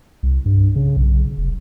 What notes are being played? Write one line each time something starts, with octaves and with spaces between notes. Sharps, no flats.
C2
G2
C#3
B1
F1